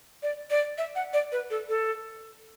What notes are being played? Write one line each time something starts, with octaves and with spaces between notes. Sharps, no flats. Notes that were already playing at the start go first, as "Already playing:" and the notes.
D5
D5
E5
F#5
D5
B4
A4
A4